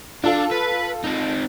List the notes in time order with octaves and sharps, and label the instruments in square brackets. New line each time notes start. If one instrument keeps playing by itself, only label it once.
[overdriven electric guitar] D4 [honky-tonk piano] F4 A4 F5
[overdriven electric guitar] B4
C4 D#4